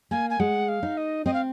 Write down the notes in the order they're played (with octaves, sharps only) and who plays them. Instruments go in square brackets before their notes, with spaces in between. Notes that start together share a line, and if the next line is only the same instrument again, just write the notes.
[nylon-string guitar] A#3 [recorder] G#5
[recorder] G#5
[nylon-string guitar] G#3 [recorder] F#5
[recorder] F5
[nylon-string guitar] D#4
[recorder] D#5
[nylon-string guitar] C4 [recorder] D#5
[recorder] F5